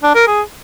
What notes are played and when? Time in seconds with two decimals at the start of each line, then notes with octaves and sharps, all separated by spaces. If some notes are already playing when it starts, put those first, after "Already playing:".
0.03 D4
0.15 A#4
0.27 G#4